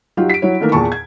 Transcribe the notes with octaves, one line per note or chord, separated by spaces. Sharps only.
F#3 D#4 F4 G4
B6 D7
F#3 E4 C#5
D#3 E3 A3 A#3 A4 A#4
E2 A#2 G#4 A5 C#6
G#6